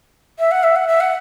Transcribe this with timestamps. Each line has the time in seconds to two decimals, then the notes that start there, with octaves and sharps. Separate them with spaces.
0.39 E5
0.51 F#5
0.63 E5
0.76 F#5
0.88 E5
1.00 F#5